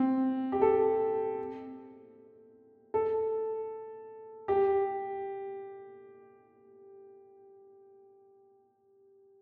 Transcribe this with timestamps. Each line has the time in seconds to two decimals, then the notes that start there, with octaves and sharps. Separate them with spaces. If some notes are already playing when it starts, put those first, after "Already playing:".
Already playing: C4
0.52 G4
0.62 A4
2.94 A4
4.48 G4